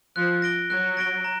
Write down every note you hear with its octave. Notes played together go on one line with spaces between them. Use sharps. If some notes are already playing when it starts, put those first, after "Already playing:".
F3 F#6
A#6 D7 G7
F#3 F#6
A#6 D7 G7
A#5